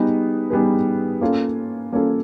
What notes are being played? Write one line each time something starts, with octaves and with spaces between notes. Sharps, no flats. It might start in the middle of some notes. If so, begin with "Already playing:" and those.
Already playing: G3 B3 D#4 G#4 B4
G3 B3 D#4 G#4 B4
A#3 C#4 F4 A4
A#3 C#4 F4 A4